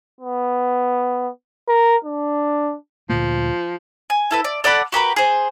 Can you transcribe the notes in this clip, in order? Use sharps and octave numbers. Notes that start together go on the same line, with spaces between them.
B3
A#4
D4
D2 A#2 F3 A#3
G#5
E4 A4 B4
D5
A4 D5 F#5 B5
F#4 G4 A#4 B4
G#4 C5